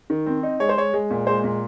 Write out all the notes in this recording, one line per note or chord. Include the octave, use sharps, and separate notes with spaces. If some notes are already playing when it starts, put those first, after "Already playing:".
D#3
C4
D#4
G#3 C#5
C5
G#3 C#5
G#3
A#2
G#3 C5
A#2